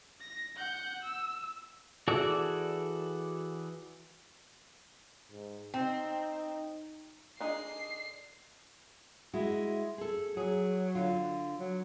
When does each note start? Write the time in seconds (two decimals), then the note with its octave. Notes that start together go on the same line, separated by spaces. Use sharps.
0.21 A#6
0.57 F#5 G6
1.03 E6
2.08 E3 F#4 G#4 A4 D5
5.32 G#2
5.74 C4 D#4 G5
7.40 D4 D#4 G#4 C7
9.34 G#3 E4 F#4
9.98 G#4 A4
10.37 F#3 G#4
10.95 D3 F4
11.60 F#3